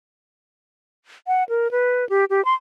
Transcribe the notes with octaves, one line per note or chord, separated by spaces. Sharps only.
F#5
A#4
B4
G4
G4
C6